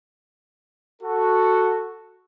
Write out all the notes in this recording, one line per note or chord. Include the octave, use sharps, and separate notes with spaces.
F#4 A4